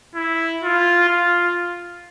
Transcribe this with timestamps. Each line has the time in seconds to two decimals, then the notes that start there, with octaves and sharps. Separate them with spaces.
0.15 E4
0.63 F4
1.08 F4